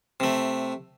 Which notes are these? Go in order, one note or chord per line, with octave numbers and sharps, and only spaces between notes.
C3 A3